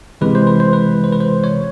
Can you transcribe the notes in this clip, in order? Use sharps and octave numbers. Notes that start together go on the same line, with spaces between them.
C3 E3 G#3 B4
C5
B4
C5
B4
C5
B4
C5
C#5